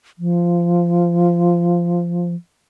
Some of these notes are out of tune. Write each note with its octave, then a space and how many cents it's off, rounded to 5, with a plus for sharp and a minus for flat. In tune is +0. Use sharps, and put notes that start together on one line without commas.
F3 -10